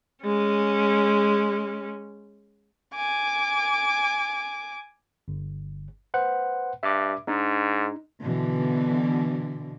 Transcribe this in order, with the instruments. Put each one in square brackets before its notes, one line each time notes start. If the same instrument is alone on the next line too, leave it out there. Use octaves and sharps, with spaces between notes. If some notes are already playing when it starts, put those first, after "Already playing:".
[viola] G#3 C#4
[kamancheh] G#5 D6
[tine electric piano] G1
B4 C5 F#5
[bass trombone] G2 [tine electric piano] E5 D6
[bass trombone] G#2 [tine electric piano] D4 D#4
[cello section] B2 D3 E3